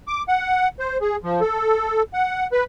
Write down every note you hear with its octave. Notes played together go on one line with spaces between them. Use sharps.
D6
F#5
C5
G#4
F3
A4
F#5
B4